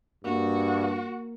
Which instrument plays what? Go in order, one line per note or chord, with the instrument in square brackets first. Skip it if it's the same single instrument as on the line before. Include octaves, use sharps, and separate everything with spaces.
[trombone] G2 [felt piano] A#3 [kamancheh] F#4